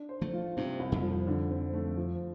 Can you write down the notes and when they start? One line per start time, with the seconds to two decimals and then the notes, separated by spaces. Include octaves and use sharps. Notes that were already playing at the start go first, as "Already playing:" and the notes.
Already playing: D4
0.09 C5
0.21 F3 A3
0.33 F4
0.57 G2 C3
0.80 C2
0.92 F2
1.03 F3
1.27 D3
1.50 C4
1.73 A3
1.97 F3